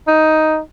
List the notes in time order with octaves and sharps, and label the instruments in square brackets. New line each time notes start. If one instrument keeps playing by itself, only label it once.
[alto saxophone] D#4